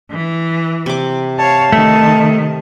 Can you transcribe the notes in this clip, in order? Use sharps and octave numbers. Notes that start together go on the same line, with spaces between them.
E3
C3 D6
C#5 F5 A5
D#3 A3